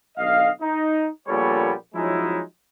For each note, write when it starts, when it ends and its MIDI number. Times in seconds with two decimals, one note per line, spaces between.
0.18 0.50 35
0.18 0.50 50
0.18 0.50 75
0.18 0.50 77
0.61 1.07 63
1.28 1.73 34
1.28 1.73 46
1.28 1.73 55
1.28 1.73 59
1.28 1.73 69
1.28 1.73 73
1.95 2.41 53
1.95 2.41 54
1.95 2.41 56
1.95 2.41 61
1.95 2.41 63
1.95 2.41 64